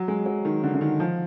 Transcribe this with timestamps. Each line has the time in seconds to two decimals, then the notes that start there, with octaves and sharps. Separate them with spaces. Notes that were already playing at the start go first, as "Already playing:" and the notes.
Already playing: F#3
0.08 G#3
0.26 F#3
0.45 D#3
0.64 D3
0.75 D3
0.81 D#3
1.00 F3